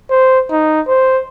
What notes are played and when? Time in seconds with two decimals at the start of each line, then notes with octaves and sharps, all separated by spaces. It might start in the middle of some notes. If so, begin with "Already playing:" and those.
0.10 C5
0.51 D#4
0.87 C5